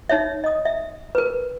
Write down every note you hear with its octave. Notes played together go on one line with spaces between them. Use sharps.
D#4 C#5 E5
D#5 D#6
E5
A#4 B4